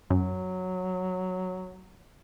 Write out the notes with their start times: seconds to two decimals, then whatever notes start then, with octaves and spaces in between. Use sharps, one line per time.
0.10 F#2 F#3